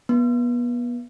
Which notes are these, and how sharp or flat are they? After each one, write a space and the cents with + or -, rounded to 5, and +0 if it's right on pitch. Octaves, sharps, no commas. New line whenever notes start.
B3 -30